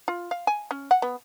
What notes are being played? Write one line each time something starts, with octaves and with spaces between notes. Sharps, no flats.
F4
F5
G#5
C#4
F#5
B3